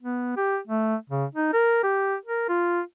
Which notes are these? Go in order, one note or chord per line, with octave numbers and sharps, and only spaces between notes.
B3
G4
A3
C#3
D#4
A#4
G4
A#4
F4